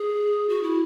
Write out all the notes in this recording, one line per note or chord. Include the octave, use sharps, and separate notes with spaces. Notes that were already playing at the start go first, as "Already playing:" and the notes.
Already playing: G#4
F#4
E4